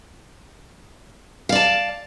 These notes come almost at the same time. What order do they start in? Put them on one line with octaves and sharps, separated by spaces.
F5 D5 A5